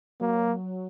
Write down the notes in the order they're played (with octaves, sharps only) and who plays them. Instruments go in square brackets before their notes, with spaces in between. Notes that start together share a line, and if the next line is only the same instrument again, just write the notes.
[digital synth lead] F#3 [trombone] A#3